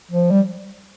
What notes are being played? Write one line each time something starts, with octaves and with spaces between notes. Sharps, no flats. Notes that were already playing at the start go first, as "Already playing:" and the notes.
F3
G3